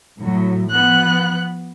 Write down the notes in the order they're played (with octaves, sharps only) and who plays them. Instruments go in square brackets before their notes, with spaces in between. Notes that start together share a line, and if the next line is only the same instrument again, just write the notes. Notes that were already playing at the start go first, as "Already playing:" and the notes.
[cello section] A2 F#3
[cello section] F3 B3 [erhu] F#6